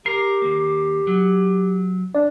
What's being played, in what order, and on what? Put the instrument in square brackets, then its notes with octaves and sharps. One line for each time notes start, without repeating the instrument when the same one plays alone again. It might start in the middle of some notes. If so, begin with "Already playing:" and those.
[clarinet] G4 [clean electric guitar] A#4 [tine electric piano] C7
[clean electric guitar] D#2 A#3
F#3
[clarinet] D4 [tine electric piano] D5